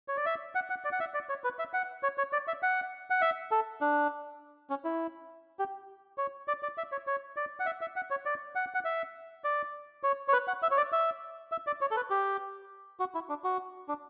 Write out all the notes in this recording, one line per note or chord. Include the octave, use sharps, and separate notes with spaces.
C#5
D5
E5
F#5
F#5
D5
F#5
E5
D5
C#5
B4
E5
F#5
C#5
C#5
D5
E5
F#5
F#5
E5
A4
D4
C#4
E4
G4
C#5
D5
D5
E5
C#5
C#5
D5
F#5
E5
E5
F#5
C#5
D5
F#5
F#5
E5
D5
C#5
C#5
B4
F#5
E5
C#5
D5
E5
E5
D5
C#5
A4
B4
G4
F#4
E4
D4
F#4
D4